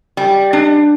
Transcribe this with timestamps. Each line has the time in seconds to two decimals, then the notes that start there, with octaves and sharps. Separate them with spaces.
0.17 G3
0.53 D4